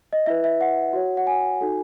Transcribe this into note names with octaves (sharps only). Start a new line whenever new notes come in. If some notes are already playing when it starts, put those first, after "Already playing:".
D#5
E4 B4 E5
E5
F#5
F#4 C#5
F#5
G#5
D#4 F#4 A4